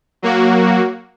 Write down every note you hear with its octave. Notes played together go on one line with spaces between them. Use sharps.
F#3 A#3 F#4